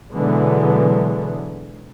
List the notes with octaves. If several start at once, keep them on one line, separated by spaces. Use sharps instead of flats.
B2 D3 E3 F#3 G#3 B3